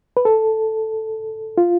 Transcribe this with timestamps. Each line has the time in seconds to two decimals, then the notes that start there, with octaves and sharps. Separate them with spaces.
0.17 B4
0.25 A4
1.58 F4